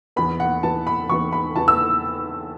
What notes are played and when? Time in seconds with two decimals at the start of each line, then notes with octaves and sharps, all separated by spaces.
0.16 E2 E3 B3 B5
0.40 F#5
0.63 E2 E3 B3 A5
0.87 B5
1.09 E2 E3 B3 C#6
1.33 B5
1.56 E2 E3 B3 A5
1.68 E6